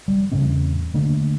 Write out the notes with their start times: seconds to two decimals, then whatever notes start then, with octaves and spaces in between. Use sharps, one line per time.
0.08 G3
0.32 E2 A2 C#3 C4
0.94 D3 A3 A#3 D4